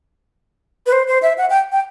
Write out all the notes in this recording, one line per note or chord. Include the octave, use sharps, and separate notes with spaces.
B4
C5
C5
E5
F#5
G5
G5